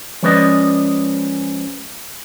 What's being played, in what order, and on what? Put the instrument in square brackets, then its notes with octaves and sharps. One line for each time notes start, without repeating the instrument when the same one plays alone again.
[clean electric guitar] F3 G#3 C#4 B4 D5 D#5